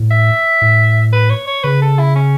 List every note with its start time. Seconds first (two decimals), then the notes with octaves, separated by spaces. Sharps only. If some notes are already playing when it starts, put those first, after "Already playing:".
Already playing: A2
0.11 E5
0.62 A2
1.12 B4
1.30 C#5
1.47 C#5
1.64 C#3 B4
1.82 A4
1.99 E4
2.15 C#4